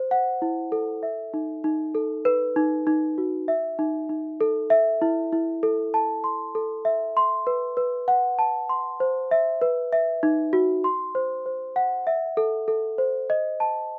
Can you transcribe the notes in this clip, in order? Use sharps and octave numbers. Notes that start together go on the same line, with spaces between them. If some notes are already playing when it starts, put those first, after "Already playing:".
Already playing: C5
F#5
E4
A4
E5
D#4
D#4
A4
B4
D#4
D#4
F#4
E5
D#4
D#4
A4
E5
E4
E4
A4
A5
C6
A4
E5
C6
B4
B4
F#5
A5
C6
C5
E5
B4
E5
D#4
F#4
C6
C5
C5
F#5
E5
A4
A4
C5
D#5
A5